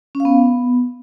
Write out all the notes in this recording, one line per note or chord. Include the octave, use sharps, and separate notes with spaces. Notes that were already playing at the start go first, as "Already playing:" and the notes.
C#4
F5
B3